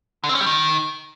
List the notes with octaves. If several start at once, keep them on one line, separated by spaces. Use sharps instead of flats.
D3
C4
C#4
G3
D#3